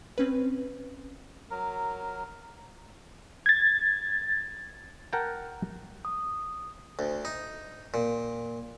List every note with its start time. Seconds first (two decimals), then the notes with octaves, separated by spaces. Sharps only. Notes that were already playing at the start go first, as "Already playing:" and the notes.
0.18 C4 C#4 B4
1.51 F#3 A#4
3.46 G#6 A6
5.13 A#4 F#5 G5 A5
6.05 D#6
6.99 D2
7.25 D#4
7.94 A#2